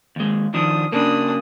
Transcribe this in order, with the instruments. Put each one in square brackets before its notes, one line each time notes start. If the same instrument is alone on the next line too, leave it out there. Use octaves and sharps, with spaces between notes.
[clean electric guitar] D#2 G#3
[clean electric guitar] D#3 F3 D4 [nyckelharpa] D#6
[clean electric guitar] C#3 A#3 [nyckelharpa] D4 D#6